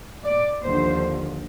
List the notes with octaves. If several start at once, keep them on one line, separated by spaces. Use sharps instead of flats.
D5
D#2 D3 F3 C5